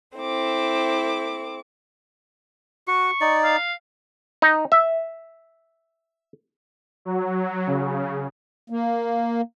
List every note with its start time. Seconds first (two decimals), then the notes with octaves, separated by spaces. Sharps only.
0.17 C4 E4 A4 D6
2.88 F#4 C#6
3.21 D#4 D5
3.44 F5
4.42 D#4
4.72 E5
7.05 F#3
7.67 C#3
8.70 A#3